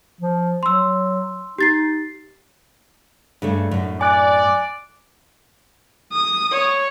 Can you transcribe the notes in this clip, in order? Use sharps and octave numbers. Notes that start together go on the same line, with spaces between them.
F3
F#3 C6 E6
D#4 G4 A6 C7
G2 C#3 A3
F#2 A2
D5 G#5 F#6
D#6
C#5